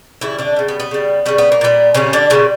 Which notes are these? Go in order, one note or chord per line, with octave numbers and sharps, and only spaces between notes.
C#3 E3 G3 E4
D3 D4
C#3 G3
B3
B3
C#3 G3
C#3 G3 C#4
B3
A#3
A#2 G3 B3
A#2 C#3 G3 C#4
D3 D4
A#2 C#3 G3 C#4